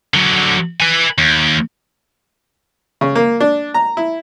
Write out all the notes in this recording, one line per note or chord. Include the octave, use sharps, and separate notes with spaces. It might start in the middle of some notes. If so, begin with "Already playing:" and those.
D3 F#3
B4 G#5
D#2
C#3
A#3
D4
A#5
E4